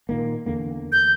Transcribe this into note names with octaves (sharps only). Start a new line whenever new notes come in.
A#2 D#3 A#3
E2 D3 A#3
G6